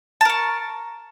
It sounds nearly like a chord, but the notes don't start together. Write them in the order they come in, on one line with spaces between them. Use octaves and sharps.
A5 A#4 C#6